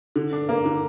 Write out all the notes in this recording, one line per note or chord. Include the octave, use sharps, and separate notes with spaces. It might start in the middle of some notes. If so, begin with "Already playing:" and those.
D3
D4
A#3
D3